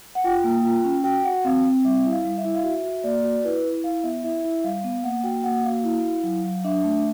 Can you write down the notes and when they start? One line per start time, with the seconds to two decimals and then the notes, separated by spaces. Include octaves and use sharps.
0.15 F#5
0.24 F4 G5
0.44 A#3
0.64 F4
0.84 C#4
1.04 F#4 G5
1.24 F#4 F#5
1.44 C4 F5
1.64 C4
1.85 G3 E5
2.05 E4
2.11 F5
2.25 G3
2.38 E5
2.45 E4
2.55 F5
2.64 F#4 E5
2.85 F#4
3.04 A#3 D5
3.24 F#4
3.44 E4 B4
3.65 E4
3.84 E4 F5
4.04 B3 E5
4.24 E4 E5
4.44 E4
4.64 G3 F5
4.84 B3
5.04 A#3 F#5
5.24 F#4 G5
5.44 A#3 F#5
5.64 F#4 F5
5.84 E4
6.05 E4
6.24 F#3
6.44 F#3
6.64 D4 E5
6.84 A3